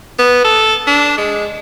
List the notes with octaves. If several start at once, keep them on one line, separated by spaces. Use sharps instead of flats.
B3
A4
D4
G#3